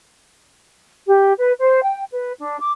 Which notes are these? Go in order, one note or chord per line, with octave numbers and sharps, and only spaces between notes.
G4
B4
C5
G5
B4
D4
D6